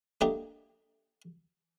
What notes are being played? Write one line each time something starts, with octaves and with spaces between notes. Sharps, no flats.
A3 A#3 D4 G4 D#5